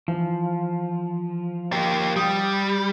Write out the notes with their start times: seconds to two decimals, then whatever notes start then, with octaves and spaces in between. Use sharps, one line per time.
0.08 E3 F3
1.73 A#3 G4
2.16 G3 G5 D#6